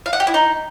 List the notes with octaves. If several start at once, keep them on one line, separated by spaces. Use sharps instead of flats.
F5
F#5
G4
E4
D#4